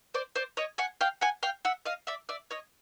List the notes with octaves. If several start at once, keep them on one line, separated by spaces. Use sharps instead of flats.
C5 D5
C5 D5
C#5 D#5
F#5 G#5
F5 G5
F#5 G#5
F5 G5
E5 F#5
D#5 F5
D5 E5
D5 E5
C#5 D#5